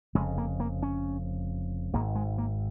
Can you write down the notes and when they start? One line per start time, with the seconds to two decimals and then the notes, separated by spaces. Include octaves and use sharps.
0.15 F1 F2 C#3 G#3
0.38 A#3
0.60 A#3
0.83 C#4
1.93 G#1 G#2 A#3
2.15 G#3
2.38 A#3